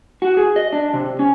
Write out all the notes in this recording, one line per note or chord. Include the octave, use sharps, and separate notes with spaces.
F#4
G#4
D#5
D4
C3
C#4